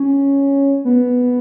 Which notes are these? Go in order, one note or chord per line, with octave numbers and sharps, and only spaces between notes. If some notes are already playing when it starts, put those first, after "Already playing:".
Already playing: C#4
B3